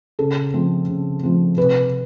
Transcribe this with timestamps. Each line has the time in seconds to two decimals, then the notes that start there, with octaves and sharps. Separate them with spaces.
0.19 C#3 A4
0.54 F3 A3 C4
0.88 C#3
1.23 F3 A3 C4
1.57 C3 B4